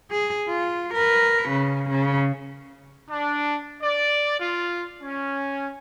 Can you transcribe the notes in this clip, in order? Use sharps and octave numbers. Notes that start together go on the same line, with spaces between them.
G#4
F4
A#4 B4
C#3
C#3
D4
D5
F4
C#4